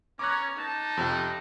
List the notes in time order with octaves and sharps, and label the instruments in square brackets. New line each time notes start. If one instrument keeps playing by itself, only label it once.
[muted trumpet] C#4 [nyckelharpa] C#5 A#5 [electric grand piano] D6 F#6
[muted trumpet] D#4 [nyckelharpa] A5
[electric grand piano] F2 C3 G5